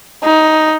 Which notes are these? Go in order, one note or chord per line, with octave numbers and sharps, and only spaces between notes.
D#4